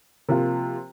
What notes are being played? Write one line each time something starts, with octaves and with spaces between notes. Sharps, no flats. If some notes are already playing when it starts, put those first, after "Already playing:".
C3 F3 A#3 F4